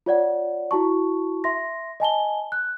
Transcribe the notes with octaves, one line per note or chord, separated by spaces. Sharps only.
F4 C#5 D5 F#5
E4 F#4 A5 C#6
E5 C6 A#6
D#5 G#5 A5 G7
F#6